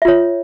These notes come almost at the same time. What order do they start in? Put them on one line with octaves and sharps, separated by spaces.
E5 F4 C#5